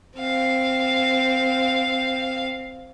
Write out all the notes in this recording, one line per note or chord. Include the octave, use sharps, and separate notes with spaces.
C4 F5